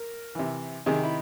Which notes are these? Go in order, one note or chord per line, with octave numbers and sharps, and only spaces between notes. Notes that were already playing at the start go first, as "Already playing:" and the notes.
Already playing: A#4
C3 E3
C3 D#3 G#4
E4